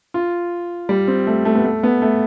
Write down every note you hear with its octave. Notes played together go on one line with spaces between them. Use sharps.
F4
G3
C4
A3
A3
B3
A3
B3
A3